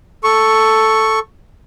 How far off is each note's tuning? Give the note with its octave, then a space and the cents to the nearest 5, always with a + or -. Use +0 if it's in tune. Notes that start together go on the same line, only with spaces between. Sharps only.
A4 +0 C#6 +0